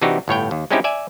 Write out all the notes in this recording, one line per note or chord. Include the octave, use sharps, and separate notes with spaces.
C3 E3 D4 D#4 F#4 G4
G1 A2 C#5 G5
D#2
G#3 C4 C#4 D#4 E4 G4
D5 E5 G#5